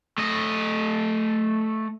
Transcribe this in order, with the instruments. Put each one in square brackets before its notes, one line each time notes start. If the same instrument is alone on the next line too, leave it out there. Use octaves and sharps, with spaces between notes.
[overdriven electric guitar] A3 D#5